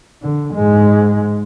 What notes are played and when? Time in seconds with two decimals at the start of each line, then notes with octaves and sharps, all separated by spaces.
0.22 D3
0.54 G#2 G#3